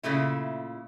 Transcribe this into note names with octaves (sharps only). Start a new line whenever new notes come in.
A#2 C#3 A3 E4